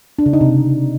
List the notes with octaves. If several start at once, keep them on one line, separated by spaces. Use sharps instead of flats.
D4
C#3
D#4
C3